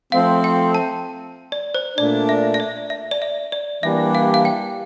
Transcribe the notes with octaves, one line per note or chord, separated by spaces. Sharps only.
F3 A3 C4 F5
G5
A5
D5
C5
A#2 A3 D4 D5
E5
E5
D5
E5
D5
E5
D5
E3 G3 A#3 D4 G4 E5
F5
F5
G5